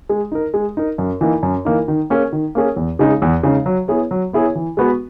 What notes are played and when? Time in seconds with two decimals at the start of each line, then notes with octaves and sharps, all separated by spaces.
0.09 G#3
0.32 D#4 A#4
0.54 G#3
0.77 D#4 A#4
0.98 F#2
1.21 E3 A#3 D#4
1.43 F#2
1.65 E3 A#3 D#4
1.88 D#3
2.10 A#3 C#4 G#4
2.32 D#3
2.55 A#3 C#4 G#4
2.76 E2
2.99 C#3 G#3 D#4
3.22 E2
3.43 C#3 G#3 D#4
3.66 F#3
3.88 B3 E4 G#4 C#5
4.11 F#3
4.33 B3 E4 G#4 C#5
4.55 E3
4.77 G#3 B3 F#4 B4